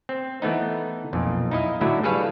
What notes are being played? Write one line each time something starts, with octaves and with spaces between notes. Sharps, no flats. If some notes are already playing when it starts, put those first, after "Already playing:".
C4
E3 A3 B3 D#4
B1 F2 A#2
D#4 E4 D#5 F5
A2 D3 F#3 A3 E4
G3 G#4 A4 B4 C#5 F5